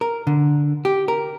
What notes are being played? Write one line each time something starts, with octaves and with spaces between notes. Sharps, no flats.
A#4
D3
G4
A#4